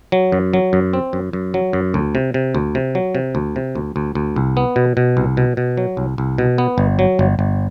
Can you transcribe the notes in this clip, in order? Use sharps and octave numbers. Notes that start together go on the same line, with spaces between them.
F#3
F#2
F#3
F#2
C4
F#2
F#2
F#3
F#2
D2
C3
C3
D2
C3
F#3
C3
D2
C3
D2
D2
D2
C2
B3
B2
B2
C2
B2
B2
F#3
C2
C2
B2
B3
G1
F#3
G1
G1